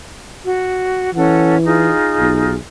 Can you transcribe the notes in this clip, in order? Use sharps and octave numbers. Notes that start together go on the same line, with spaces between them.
F#4
E3 C#4 A4 F#5
D#4 F4 G#4
B1